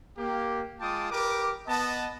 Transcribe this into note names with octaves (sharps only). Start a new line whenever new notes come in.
A#3 G4
G#3 F4 G5 A5 D6 D#6
G4 A#4 B4 D6
B3 D#5 A5